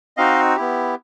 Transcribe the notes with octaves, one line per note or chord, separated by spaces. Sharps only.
C4 D#4 F#4 D#5 F5
B3 E4 G4